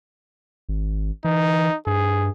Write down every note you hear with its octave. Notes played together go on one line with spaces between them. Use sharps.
G#1
E3 D#4
G2 G#4